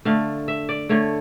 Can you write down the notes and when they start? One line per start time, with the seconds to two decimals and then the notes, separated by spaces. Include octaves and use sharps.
0.05 D3 A3 F5
0.48 E5
0.69 D5
0.89 D3 A3 C#5